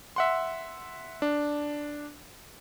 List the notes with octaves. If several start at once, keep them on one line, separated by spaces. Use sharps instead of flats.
E5 F#5 C6
D4